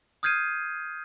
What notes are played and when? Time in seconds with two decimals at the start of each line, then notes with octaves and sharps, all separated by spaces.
0.23 D#6 F6 G6 G#6 C7 D#7